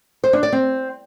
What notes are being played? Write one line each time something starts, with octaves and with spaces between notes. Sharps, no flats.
C5
D4
D5
C4